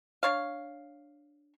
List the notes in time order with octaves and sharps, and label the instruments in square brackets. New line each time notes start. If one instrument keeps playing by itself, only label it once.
[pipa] D4 C#5 F5